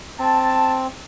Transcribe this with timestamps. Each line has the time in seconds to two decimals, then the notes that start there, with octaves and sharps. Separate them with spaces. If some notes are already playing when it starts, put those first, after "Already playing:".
0.19 C4 A5